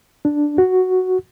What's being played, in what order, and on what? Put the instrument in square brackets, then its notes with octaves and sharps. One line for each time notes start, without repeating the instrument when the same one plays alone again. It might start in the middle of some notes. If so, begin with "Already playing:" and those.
[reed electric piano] D4
F#4